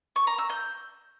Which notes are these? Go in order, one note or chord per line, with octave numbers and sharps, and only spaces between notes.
C#6
A#5
E6
G6